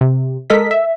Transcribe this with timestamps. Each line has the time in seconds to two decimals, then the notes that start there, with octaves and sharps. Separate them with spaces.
0.01 C3
0.50 G#3 A4 A#4 D#5 B6
0.71 E5